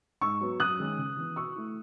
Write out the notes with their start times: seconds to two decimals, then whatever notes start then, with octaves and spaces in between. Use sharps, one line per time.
0.21 G#2 C#6 E6
0.41 F#3 B3
0.60 F#2 D#6 F#6
0.79 D#3 G#3 C#4
0.98 C#3
1.17 E3 B3
1.36 B2 C#6 E6
1.56 A3 E4